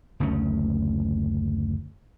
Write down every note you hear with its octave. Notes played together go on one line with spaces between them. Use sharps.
F#1 D2 A3 C#4